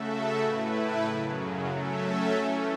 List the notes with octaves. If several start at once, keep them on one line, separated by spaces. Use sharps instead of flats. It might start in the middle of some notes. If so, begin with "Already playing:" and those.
Already playing: C#3 A3 F#4 A4 E5
A2 A3 E4 B4
F#2 C#3 F#3
F#3 A3 C#4 A4 E5
E3 A3 C#4